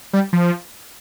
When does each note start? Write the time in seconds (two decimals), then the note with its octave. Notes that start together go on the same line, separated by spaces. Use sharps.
0.13 G3
0.33 F3